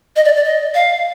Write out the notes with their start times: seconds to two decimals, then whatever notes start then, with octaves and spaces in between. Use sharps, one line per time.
0.16 D#5
0.25 D5
0.36 D5
0.45 D#5
0.75 F5